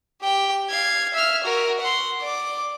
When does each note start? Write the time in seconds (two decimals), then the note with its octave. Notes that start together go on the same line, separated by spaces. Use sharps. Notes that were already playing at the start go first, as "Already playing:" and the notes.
0.21 G4 G5
0.70 F5 G#6
1.13 E5 F6
1.44 F#4 A#4
1.80 F#5 C6
2.21 D5 D6